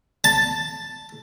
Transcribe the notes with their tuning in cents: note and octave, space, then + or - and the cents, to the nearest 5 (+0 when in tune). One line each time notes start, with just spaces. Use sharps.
A5 +5